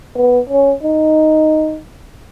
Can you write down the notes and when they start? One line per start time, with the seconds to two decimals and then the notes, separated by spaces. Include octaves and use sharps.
0.16 B3
0.50 C#4
0.83 D#4